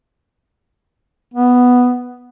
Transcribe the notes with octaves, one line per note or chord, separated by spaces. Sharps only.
B3